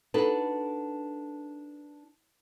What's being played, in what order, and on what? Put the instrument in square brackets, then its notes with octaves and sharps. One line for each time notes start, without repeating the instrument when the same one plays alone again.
[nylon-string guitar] D4 D#4 F#4 A4 B4